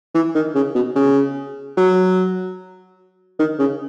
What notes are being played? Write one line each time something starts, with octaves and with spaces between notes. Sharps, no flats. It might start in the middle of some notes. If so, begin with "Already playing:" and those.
E3
D#3
C#3
B2
C#3
F#3
D#3
C#3